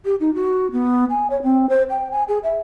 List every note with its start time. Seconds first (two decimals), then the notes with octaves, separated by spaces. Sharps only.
0.05 G4
0.20 D#4
0.35 F#4
0.72 B3
1.10 G#5
1.30 C#5
1.43 C4
1.69 C5
1.90 G5
2.11 G#5
2.28 G#4
2.43 E5